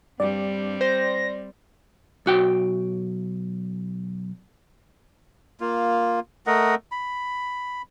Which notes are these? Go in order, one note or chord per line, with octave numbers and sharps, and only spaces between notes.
G2 G3 C4 D5
C5 A#6
B1 F#4 G5
A#3 F4
A3 A#4 D#5 F#5
B5